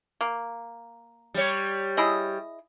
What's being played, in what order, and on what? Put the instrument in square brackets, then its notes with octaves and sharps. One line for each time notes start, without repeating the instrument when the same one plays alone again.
[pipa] A#3
[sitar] G3 C#5
[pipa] E4 G#4 D#5